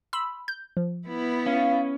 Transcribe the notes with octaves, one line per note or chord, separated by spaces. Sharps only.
B5 C6 E6
G6
F3
B3 E4
C#4 F5